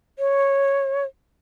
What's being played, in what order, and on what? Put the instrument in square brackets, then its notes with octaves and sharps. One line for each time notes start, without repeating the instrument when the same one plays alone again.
[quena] C#5